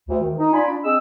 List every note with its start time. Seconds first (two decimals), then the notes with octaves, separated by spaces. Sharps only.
0.09 D2
0.21 D#3
0.37 D#4
0.53 F4 D5 G#5 B5
0.67 D4
0.83 C4 G#4 D#5 E6